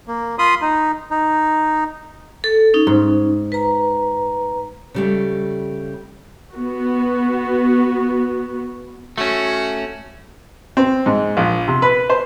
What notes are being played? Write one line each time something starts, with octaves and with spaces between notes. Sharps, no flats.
A#3
F4 B5 C6 D#6
D#4
D#4
A4
C#4 D#4
G#2
B4 A#5
C#3 G3 A3
B3 F#4
A3 C#4 F#4
C4
G#2
A#1
C3
B4
C5